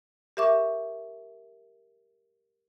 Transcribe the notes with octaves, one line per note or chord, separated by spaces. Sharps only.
G4 A#4 E5 C#6 D6